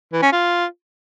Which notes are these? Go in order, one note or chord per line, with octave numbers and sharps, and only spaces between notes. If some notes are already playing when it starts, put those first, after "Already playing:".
E3
C#4
F4